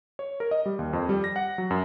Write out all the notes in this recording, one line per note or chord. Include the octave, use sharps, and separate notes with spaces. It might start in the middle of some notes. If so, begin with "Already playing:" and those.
C#5
A#4
D#5
G3
D#2
F2
G3
A#6
F#5
F#3
F#2